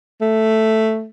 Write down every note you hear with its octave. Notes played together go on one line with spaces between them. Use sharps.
A3